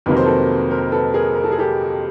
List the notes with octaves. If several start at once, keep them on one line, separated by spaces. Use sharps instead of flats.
F2 C3 D#3 F#3 A#3 B4
C5
A4 B4
A#4 C5
A4 B4
G#4 A#4
A#4
A4
G#4
G4 A4